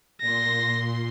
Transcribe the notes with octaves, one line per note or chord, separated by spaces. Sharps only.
A#2 C6 A#6